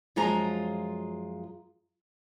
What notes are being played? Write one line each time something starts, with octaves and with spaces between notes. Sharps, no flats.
F#2 F3 G#3 F4 A#5